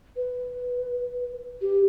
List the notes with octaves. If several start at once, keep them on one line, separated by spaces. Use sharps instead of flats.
B4
G4